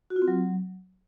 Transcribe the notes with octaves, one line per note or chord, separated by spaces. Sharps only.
F#4
F4
C4
F#3